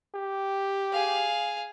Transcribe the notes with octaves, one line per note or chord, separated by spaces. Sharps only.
G4
G#4 F5